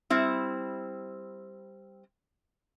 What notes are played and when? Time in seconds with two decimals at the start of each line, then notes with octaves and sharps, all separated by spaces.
0.10 G3 C4 E4